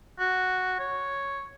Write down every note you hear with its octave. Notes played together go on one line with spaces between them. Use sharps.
F#4
C#5